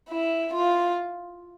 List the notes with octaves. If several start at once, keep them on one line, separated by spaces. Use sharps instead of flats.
E4
F4